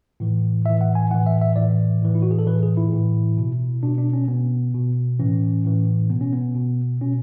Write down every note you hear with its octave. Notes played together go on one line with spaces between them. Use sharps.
A2 E3
A2 E3 E5
F#5
G#5
A2 E3 F#5
E5
E5
A2 E3 D5
A2 E3
E4
F#4
G#4
A4
A2 E3 B4
G#4
E4
A2 E3
B2
B2 D4
D4
C#4
B2 B3
B2
A2 E3 C#4
A2 E3
B2 B3
C#4
B3
B2
B2 C#4